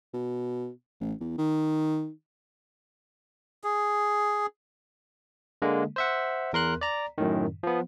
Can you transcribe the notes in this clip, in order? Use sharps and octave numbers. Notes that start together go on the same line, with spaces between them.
B2
A1
E2
D#3
G#4
D3 G#3 A#3
C5 E5 F#5
E2 A#4 C6 F#6
D5 A#5
F#2 A2 D#3
F3 B3